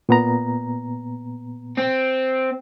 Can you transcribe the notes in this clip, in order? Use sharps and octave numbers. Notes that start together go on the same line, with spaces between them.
A#2 B3 A#5
C4